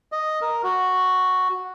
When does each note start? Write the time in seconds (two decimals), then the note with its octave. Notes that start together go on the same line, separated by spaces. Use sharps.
0.12 D#5
0.42 A#4
0.64 F#4